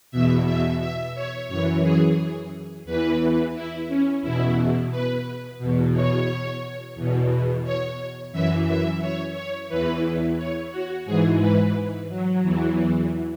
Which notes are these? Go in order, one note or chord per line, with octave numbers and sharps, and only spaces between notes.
E2 B2 E5
E5
E5
C#5
F#2 E3 C#5
G#4
E2 E3 B4
E4
C#4
E2 B2 E4
B4
E2 B2
C#5
E2 B2
C#5
F#2 E3 E5
E5
C#5
C#5
E2 E3 B4
C#5
F#4
G#2 E3 G#4
B4
F#3
E2 E3